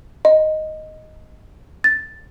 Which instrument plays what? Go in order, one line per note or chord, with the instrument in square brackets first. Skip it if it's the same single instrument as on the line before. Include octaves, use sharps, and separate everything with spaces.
[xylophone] D#5
A6